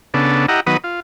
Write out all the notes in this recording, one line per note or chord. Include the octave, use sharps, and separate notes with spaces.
C#3 B3 D4 A4
E4 G4 D#5 F#5 A#5
D#3 F#3 B3 B4 D#6
F4